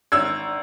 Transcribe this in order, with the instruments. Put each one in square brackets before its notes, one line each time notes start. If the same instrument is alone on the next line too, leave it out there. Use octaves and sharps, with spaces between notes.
[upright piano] G#1 E6 G#6